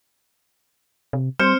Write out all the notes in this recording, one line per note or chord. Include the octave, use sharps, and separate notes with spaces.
C3
G3 C4 C5 F6 C#7